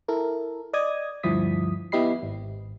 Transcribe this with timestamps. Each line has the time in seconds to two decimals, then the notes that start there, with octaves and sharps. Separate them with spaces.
0.08 E4 A4 A#4
0.73 D5 D#5 D#6 G#6
1.23 D2 G2 F3 E4 D#6 B6
1.92 B3 E4 G4 D#5 B5 C7
2.23 G#1